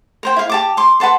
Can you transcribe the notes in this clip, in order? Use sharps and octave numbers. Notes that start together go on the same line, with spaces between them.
A#4 C5 G5
E4 F5
G4 A5 D6
C6 D6
B4 F#5 A5 C6